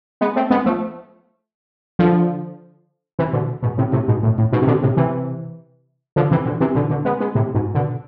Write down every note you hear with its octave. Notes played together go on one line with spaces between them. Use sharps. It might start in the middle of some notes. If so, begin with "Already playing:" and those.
G#3 B3
A3 C4
G#3 B3
F3 A3
D3 F3
C3 E3
B2 D3
G#2 B2
A2 C3
A2 C3
G#2 B2
A2
A2
G#2 B2
C3
B2 D3
A2 C3
C3 E3
D3 F3
C3 E3
B2 D3
C3 E3
B2 D3
B2 D3
G#3 B3
G#3 B3
A2 C3
G#2 B2
B2 D3